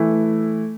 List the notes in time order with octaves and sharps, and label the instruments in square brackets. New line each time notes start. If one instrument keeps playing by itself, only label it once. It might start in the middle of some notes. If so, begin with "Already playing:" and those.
Already playing: [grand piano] E3 A3 E4